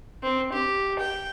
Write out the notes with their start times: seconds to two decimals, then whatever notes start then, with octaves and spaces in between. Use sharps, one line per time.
0.23 C4
0.53 G4
0.99 G5